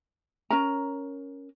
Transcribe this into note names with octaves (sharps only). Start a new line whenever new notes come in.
C#4 A#4 A#5